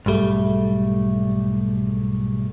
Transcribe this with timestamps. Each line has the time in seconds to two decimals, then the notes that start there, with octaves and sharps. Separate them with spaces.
0.06 B1 G#2 G3 A3